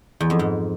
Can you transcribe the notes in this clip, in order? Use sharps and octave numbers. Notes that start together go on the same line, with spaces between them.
E2
F2
G#2